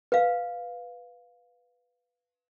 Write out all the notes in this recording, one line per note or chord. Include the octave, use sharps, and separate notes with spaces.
B4 F5